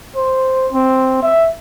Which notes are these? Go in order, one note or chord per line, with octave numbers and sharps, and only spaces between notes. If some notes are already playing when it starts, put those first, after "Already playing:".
C5
C4
E5